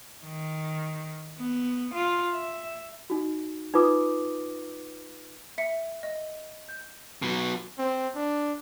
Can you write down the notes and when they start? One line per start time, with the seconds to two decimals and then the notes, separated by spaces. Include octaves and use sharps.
0.24 D#3
1.39 B3
1.94 F4
2.34 E5
3.10 D#4 F#4
3.74 D#4 F4 B4 D6 D#6
5.58 E5 C#7
6.03 D#5
6.69 G6
7.22 B2 F#3
7.79 C4
8.16 D4